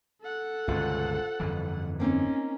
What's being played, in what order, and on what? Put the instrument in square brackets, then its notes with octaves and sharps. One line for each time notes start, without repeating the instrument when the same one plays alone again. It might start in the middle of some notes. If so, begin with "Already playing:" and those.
[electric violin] A4 F#5
[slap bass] G1 C#2 B2 [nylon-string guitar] F4 C5
[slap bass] G1 F2 E3
[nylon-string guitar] A#3 C4 D#4 [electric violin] C#4